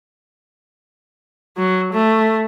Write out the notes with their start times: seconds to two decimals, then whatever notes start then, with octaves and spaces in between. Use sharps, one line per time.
1.57 F#3
1.93 A3